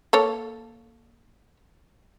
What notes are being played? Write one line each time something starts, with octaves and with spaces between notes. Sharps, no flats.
A#3 A4 C#5